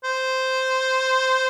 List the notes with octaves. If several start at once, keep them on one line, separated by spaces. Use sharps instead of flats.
C5